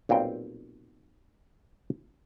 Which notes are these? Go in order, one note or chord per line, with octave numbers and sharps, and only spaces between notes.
B1 A#2 G3 C4 G5